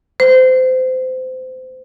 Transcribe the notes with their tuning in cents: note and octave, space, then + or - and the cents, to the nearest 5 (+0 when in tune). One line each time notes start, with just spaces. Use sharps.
C5 -25